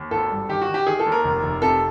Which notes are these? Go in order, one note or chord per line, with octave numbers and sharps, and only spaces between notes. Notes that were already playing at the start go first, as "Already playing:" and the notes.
Already playing: D#2
G#1 A4
G2
D#3 G4
F#4
D#3
G4
D#3 G#4
A4
D#2
A#4
F1
F1
C3 A4